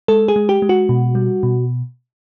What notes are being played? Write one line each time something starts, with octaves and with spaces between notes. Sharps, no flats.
G#3 A4
G#4
G#3
G4
G#3
F#4
B2
G3
B2